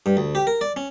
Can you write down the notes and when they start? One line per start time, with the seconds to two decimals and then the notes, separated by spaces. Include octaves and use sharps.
0.06 G2
0.17 D2
0.35 G4
0.47 A#4
0.61 D5
0.76 C#4